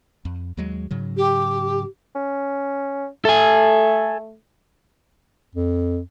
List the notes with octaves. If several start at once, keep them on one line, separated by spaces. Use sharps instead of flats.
F2
D#2 F#3 G#3
G#2 C#3 F#3
G4
C#4
A3 A4 G#5
F2